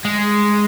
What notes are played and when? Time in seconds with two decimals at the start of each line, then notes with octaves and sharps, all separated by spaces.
0.05 G#3